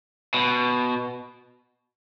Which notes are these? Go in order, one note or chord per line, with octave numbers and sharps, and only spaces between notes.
B2